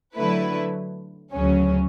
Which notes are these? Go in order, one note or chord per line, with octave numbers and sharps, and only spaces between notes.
D3 F#3 A3 E4 B4
D2 C#3 F#3 C#4